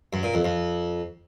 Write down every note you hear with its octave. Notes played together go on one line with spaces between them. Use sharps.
F#2
A#2
F2
F2